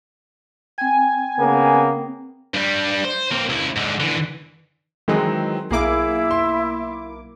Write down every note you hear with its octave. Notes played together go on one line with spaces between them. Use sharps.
C4 G5 G#5
C#3 A#3 B3
G2 G3
C5
A#3 C4
C#2 E4
G#2 D3
D3 E3
D#3 E3 F#3 G#3 C4 D#4
B1 A#3 E4 G#4 D6
E5 C6